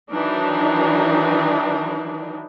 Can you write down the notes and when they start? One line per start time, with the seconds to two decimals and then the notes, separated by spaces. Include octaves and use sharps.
0.11 D#3 E3 F#3 D4 D#4